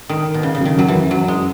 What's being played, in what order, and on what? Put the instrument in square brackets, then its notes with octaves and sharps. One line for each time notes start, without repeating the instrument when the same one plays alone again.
[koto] D#3
B2
C#3
C#3
[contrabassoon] F#2
[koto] D#3
[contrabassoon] F#2 [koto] F#3
[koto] E3
[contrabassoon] F#2
[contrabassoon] F#2 [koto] F#3
[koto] G#3